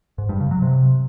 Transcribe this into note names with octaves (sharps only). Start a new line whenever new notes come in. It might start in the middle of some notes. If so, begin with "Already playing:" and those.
G#2
G2
C#3
F#3
C3